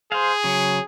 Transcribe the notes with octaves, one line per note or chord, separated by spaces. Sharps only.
G#4 C5 F5
C#3 F#3